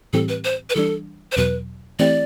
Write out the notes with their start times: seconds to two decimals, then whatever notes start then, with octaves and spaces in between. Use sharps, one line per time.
0.13 A2 E3 G3 C4 G4 A4
0.29 B4
0.44 C5
0.70 B4
0.76 E3 G3 D4 A4
1.32 C5
1.37 E2 B2 F#3 B4
1.99 E3 A3 C4 E4 G4 D5